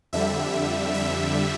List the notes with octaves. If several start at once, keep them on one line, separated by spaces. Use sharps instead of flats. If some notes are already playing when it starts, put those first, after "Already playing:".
F2 D3 G3 E5
E5